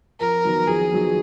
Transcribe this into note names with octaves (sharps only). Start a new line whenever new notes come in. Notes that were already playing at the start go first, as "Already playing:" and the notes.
F2 A#4
D#3 F#3 B3
F2 G#4
D#3 F#3 B3